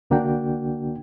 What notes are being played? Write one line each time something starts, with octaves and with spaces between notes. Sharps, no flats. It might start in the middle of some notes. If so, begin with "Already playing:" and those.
C2 D3 A#3 D4 F#4 G5